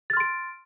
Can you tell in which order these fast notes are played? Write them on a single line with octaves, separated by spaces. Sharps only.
A6 F6 C6 D7